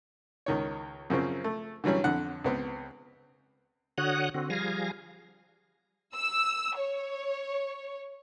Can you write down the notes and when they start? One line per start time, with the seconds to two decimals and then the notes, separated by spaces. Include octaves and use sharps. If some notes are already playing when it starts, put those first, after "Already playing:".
0.46 C#2 D#3 C#5
1.10 F#2 C#3 F3 C4
1.44 A3
1.84 D3 E3 F#3 G3 C#4
2.04 F2 D3 F#5
2.45 C#2 B3 C4
3.98 D3 F#4 C#5 F#5 D#6 F#6
4.34 D3 C4 F#4
4.50 F3 G3 G#4 F5 G#5 A#6
6.16 E6
6.78 C#5